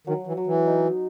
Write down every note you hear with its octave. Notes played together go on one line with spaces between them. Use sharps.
D#3 F#3
E3
F#3
E3
D#4